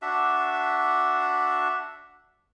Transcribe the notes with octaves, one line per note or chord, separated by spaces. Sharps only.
D4 F#4 E5